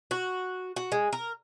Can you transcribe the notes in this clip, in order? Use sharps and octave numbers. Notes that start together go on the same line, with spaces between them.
F#4
F#4
G#3
A#4